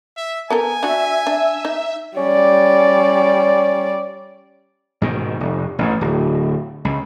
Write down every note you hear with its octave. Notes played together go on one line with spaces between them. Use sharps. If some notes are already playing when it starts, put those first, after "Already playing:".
E5
B3 A4 A#4 G#5
D4 F#4 E5
D4
D#4
G3 C#4 D5
G#2 B2 D#3
F1
A1 G#2
D1
C#2